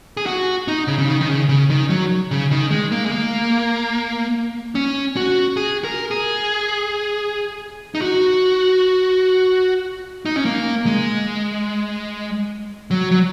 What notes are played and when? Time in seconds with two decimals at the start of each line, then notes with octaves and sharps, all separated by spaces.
0.17 G#4
0.26 F#4
0.68 D#4
0.87 C#3
0.99 C#3
1.09 D#3
1.21 D#3
1.29 C#3
1.49 C#3
1.70 D#3
1.90 F#3
2.31 C#3
2.51 D#3
2.71 G#3
2.92 A#3
3.06 G#3
3.12 A#3
4.75 C#4
5.16 F#4
5.57 G#4
5.84 A#4
6.11 G#4
7.95 D#4
8.02 F#4
10.26 D#4
10.36 C#4
10.45 A#3
10.86 G#3
12.91 F#3
13.11 F#3